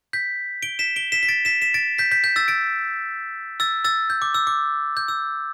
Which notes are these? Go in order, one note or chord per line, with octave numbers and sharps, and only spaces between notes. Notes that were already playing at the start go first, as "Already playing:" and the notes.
G6 B6
D7 G7
B6 E7
D7 G7
B6 E7
B6
A6 D7
B6 E7
B6 E7
A6 D7
G6 B6
G6 B6
G6
E6 A6
A6 D7
E6 A6
E6 A6
G6
D6
E6
D6
G6
E6